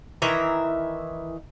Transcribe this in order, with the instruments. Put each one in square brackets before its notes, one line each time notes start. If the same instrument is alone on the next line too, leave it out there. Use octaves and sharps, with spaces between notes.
[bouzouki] D#3 E3 E5 A#5